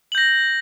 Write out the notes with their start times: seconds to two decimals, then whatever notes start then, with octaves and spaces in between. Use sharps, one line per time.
0.12 F#7
0.15 G6
0.18 A#6